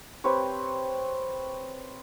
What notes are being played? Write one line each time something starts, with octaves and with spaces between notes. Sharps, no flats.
C4 G4 B4 C#5